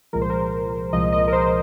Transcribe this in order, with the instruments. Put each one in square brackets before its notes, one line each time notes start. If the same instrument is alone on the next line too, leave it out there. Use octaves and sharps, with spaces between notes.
[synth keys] C2 A#2 F3 G#3 A#4
C5
A#4
C2 A#2 F3 G#3 D#5
D#5
A#4
C5